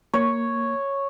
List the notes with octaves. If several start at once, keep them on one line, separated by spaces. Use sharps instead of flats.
A#3 C#5